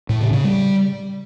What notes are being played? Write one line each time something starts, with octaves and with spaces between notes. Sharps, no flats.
A2
C#3
C#3
G3